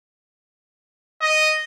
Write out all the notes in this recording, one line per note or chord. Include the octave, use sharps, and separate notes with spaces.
D#5